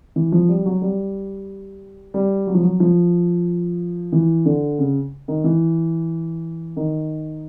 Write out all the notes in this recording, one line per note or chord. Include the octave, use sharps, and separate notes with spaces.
E3
F3
G3
F#3
G3
G3
F#3
F3
F#3
F3
E3
D3
C#3
D#3
E3
D#3